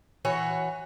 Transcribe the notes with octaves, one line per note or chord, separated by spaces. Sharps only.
E3 F#4 C#5